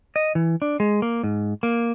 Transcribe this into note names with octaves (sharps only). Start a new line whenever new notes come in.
D#5
E3
D4
G#3
A#3
G#2
A#3